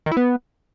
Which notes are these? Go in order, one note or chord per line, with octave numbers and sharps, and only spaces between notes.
D#3
E4
B3